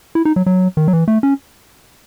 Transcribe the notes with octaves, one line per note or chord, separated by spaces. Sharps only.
E4
D#4
F#3
F#3
D#3
F#3
E3
A3
C#4